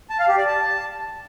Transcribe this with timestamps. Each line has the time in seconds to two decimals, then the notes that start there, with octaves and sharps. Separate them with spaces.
0.10 A5
0.19 F5
0.28 G4
0.38 D5
0.47 A5